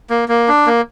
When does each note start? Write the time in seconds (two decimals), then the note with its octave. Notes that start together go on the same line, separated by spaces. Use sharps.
0.10 A#3
0.29 A#3
0.48 D4
0.67 A#3